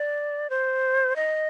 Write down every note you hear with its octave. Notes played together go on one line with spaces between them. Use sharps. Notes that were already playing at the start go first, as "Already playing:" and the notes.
Already playing: D5
C5
D#5